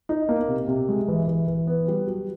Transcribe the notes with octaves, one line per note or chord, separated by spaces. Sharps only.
D#4
A#3
C3
C3
G#3
E3
E3
E3
B3
G3
F#3